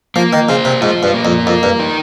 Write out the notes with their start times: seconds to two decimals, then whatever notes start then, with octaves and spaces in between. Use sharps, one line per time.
0.16 F3 A#3
0.33 D#3
0.49 C#3 C5
0.65 C3
0.81 G#2 F4
1.03 G2
1.14 A#3
1.25 F2
1.47 F2 A#4
1.63 G2
1.79 D#4